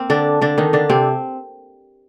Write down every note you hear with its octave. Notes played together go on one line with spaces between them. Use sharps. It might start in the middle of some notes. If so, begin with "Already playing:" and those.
Already playing: A#3 C4
D3 D4
D3 D4
D#3 D#4
D3 D4
C3 C4